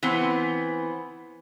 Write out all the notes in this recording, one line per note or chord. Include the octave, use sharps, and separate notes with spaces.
E3 B3 C4